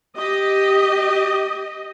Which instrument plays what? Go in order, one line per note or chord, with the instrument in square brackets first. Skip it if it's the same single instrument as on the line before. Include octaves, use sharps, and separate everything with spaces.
[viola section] G4 D#5